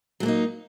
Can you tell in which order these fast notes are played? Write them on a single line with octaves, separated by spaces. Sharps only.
F#3 A3 A#3 D#4